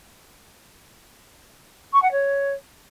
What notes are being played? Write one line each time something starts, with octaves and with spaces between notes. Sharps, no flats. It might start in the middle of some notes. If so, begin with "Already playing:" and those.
C#6
F#5
C#5